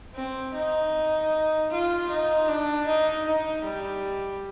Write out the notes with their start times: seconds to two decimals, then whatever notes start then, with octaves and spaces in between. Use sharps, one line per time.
0.14 C4
0.53 D#4
1.71 F4
2.10 D#4
2.48 D4
2.87 D#4
3.26 D#4
3.64 G3